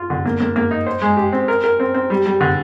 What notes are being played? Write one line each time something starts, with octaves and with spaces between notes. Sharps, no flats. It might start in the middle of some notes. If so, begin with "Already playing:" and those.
Already playing: F4
D3
A#3
A#3
A#3
D#4
C5
G#3
G4
C4
A#4
A#4
C4
C4
G3
G3
D3